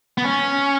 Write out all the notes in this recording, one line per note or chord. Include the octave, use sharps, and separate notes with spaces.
B3
C#4